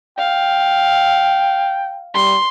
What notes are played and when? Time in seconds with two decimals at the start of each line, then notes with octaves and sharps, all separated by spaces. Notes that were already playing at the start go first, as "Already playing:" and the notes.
0.18 F5 G5
2.15 G3 C6